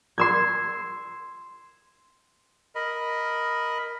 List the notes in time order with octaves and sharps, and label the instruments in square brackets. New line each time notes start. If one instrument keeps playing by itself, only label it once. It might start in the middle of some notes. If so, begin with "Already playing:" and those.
[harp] C6 E6 G#6
[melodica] A#4 D#5 B5